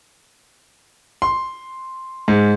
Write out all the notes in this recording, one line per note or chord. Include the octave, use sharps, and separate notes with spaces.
C6
G#2